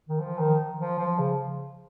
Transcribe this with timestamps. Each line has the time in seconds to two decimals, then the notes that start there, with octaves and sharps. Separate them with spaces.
0.09 D#3
0.20 F3
0.38 D#3
0.79 F3
0.99 F3
1.19 C#3